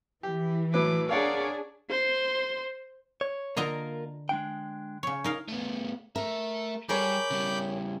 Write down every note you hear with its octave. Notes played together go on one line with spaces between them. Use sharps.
E3 G4
A2 F#3 B4 D6
D4 G#4 A#4 C#5 D5 F5 F#5
C5 C6
C#5
D3 A#3 F4 A#4 D#5 A#5
G#3 D4 G5
C#3 C#5
D#4 A#4 F5
A3 B3
A3 A#4 E5
G3 G#4 A#4 C#5 B5 D6 G6
C#3 G3